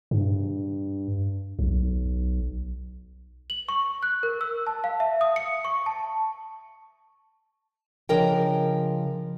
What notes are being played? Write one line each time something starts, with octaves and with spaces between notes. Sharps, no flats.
G2
B1
F#7
C#6
F#6
A#4
E6
A5
F5
E5
D#6
C#7
C#6
A5
C#3 F3 D4 A#4 D#5 G5